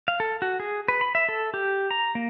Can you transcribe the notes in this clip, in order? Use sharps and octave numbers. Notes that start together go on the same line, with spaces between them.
F5
A4
F#4
G#4
B4
B5
E5
A4
G4
A#5
A#3